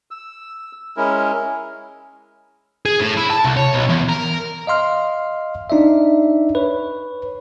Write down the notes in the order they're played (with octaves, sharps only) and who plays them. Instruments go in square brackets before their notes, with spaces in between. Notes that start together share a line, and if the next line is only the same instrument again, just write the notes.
[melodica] E6
G#3 C#4 E4 A#4
[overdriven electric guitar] G#4
A2
E4
A5
C2
C#5
B1
E2
A#4
[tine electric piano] D#5 F5 C6 F6
D4 D#4 D5 E5
B4 C#5